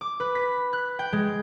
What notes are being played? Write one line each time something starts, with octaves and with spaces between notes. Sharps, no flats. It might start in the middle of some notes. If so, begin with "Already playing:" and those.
D6
B4
B6
F#6
G5
G#3